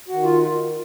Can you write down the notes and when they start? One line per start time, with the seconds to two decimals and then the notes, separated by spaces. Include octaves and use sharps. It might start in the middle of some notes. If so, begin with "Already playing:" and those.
0.08 F#4
0.13 D#3
0.23 F4